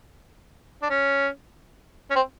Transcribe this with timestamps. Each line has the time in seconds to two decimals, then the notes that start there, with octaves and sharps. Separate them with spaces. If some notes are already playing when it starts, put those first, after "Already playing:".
0.82 D4
0.90 C#4
2.10 C#4
2.15 C4